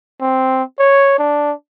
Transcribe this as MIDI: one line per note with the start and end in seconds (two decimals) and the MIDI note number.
0.21 0.63 60
0.79 1.17 73
1.19 1.52 62